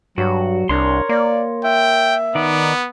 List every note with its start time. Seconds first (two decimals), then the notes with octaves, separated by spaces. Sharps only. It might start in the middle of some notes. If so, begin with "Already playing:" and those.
0.18 G2 F#3 F#4
0.69 C2 D4 A#4 C#5 C6
1.09 A#3 D5
1.64 E5 G5
2.35 D#3 B3 D#4 D5